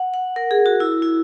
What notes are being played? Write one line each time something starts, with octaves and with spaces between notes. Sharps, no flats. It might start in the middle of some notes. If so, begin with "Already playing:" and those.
Already playing: F#5
F#5
A#4
G#4
F#4
E4
E4